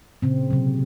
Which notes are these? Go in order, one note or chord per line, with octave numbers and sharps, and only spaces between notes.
A#2 C#3 C4
C3 F#3